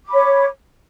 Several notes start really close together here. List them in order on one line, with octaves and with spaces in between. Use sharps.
D6 B5 C#5